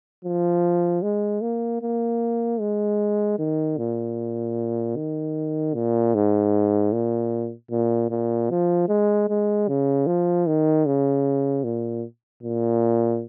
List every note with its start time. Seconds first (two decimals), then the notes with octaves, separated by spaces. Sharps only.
0.25 F3
1.03 G#3
1.42 A#3
1.82 A#3
2.60 G#3
3.39 D#3
3.78 A#2
4.96 D#3
5.74 A#2
6.15 G#2
6.93 A#2
7.71 A#2
8.11 A#2
8.50 F3
8.89 G#3
9.29 G#3
9.68 C#3
10.07 F3
10.47 D#3
10.86 C#3
11.64 A#2
12.43 A#2